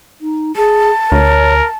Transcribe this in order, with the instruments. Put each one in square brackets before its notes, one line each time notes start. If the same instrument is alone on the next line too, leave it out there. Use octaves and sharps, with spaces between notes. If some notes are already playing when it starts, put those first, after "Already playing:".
[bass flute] D#4
[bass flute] G#4 [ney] A5
[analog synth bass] D2 [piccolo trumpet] A#4 [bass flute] C#5